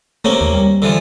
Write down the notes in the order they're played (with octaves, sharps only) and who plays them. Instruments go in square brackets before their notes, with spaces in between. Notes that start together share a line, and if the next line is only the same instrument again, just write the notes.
[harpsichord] C3 A#3 C#4 [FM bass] A3
[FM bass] D#2
G3
[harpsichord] D3 E3 F3